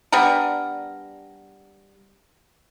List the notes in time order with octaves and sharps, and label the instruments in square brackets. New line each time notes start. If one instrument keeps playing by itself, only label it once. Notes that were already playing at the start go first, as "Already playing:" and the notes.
[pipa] G3 B3 D4 A#4